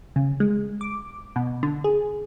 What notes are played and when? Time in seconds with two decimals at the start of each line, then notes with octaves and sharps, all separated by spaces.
0.16 C#3
0.40 G#3
0.81 D6
1.36 B2
1.63 D3
1.84 G#4